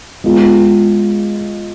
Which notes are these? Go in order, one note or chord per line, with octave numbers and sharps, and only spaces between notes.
G#3 B3 F4